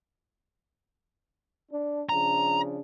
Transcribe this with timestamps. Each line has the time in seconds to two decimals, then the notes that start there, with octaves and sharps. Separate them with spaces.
1.71 D4
2.09 C#3 F3 D4 A#5